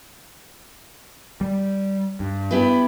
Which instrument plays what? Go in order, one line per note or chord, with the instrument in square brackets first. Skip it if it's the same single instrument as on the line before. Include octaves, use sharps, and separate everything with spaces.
[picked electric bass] G3
G2
[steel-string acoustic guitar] B3 E4 G4